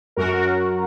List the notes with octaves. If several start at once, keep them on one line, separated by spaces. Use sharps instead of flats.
F#2 F#4 A#4
F#4 A#4